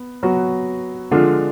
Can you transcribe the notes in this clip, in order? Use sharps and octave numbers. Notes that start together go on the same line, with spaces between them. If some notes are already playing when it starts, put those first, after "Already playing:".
Already playing: B3
F#3 B3 F#4
D3 F3 G#3 D4 F4